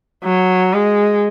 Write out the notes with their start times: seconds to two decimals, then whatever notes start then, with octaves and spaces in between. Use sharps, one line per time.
0.24 F#3
0.73 G#3